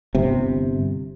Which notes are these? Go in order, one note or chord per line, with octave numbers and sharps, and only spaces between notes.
G1 C3